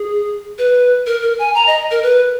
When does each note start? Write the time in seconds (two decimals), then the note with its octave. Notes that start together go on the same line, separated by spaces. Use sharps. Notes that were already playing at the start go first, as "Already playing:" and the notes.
Already playing: G#4
0.58 B4
1.06 A#4
1.22 A#4
1.39 G#5
1.55 A#5
1.67 D#5
1.91 A#4
2.03 B4